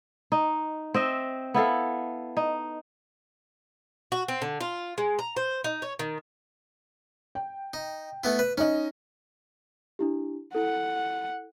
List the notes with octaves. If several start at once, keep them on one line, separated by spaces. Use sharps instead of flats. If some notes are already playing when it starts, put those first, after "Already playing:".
D#4
C4 D#5 E5
B3 E4 A4 F5
D#4
F#4
C4
D3
F4
G#3
A#5
C5
D#4
C#5
D#3
G5
D#4
A3 B3 E4
B4
C#4 D#4 D#5
D4 E4 G4
E4 A4 F#5